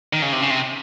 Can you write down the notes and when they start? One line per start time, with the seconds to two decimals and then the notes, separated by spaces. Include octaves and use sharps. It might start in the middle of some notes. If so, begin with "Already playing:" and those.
0.13 D#3
0.22 C#3
0.32 C3
0.42 C#3
0.50 C3